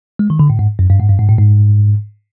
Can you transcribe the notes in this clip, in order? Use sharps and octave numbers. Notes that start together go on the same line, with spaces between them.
G#3
D#3
D3
A2
G#2
F#2
G2
G#2
G2
G#2
A2
G#2